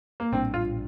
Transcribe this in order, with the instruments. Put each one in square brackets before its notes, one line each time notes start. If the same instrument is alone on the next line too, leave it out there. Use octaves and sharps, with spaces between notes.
[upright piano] A#3
[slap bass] A#1 A2 G3 D4 [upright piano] C4
[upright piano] F4